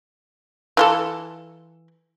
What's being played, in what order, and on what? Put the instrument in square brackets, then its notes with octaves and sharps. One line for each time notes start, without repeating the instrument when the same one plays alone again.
[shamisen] E3 F4 A4